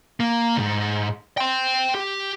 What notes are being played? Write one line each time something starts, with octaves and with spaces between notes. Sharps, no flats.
A#3
C2 G#2
G5 C6
G4